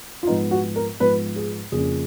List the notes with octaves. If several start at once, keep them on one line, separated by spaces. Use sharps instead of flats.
F4
G#2 F3 B3 D#4
F#4
A#4
G#2 F3 B3 B4
G#4
F2 C#3 F3 A#3 C#4 G#4